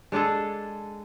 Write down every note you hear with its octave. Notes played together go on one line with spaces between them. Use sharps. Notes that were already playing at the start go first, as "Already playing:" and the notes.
G#3 D4 G#4 A4